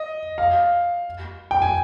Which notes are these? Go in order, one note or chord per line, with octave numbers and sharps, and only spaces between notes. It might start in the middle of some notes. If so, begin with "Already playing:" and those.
Already playing: D#5
F5
G5
G#5